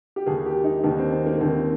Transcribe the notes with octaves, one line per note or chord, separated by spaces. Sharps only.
G4
D#2 D#3 A#3 G#4
G4
D#4
D#2 D#3 A#3 D4
C4
C4
A#3
D#2 D#3 A#3 C4